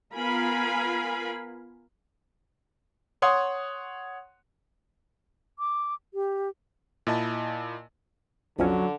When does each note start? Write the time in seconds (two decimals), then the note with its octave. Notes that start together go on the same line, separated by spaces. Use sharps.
0.15 B3 F4 A#4 F5 G#5 B5
3.22 C#5 F#5 C6 D#6
5.59 D6
6.14 G4
7.07 A#2 E4 D#5 A5
8.59 B1 F2 D3 F#3 C#4